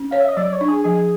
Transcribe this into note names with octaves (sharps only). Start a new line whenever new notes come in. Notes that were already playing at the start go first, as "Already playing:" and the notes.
Already playing: C#4
C#5 F5
E5
D#5
F#3 D5
C#5
D4
G#4
F3 G#4